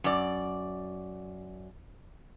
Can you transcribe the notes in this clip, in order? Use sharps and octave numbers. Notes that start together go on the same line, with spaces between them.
F#2 D5